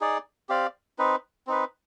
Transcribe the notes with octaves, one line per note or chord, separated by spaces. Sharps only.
D#4 G#4 D5
C4 G4 D5 F5
C4 D#4 B4
C4 D#4 B4